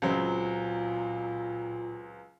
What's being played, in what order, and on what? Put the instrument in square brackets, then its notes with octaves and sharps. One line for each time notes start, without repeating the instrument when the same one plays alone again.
[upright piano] C#2 F#3 C4 [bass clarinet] A#2